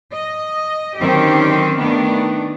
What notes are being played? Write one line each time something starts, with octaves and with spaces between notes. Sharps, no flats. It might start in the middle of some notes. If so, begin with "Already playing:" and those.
D#5
D3 D#3 F#3 C4 C#4 G4
D#3 A3 B3 D4